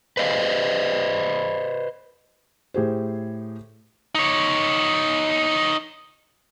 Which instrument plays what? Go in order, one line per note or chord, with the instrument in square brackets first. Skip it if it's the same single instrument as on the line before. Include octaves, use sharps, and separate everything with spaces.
[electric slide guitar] B4 C5 D#5 F5
[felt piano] A2 G4 G#4 C5
[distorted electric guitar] D#4 C#5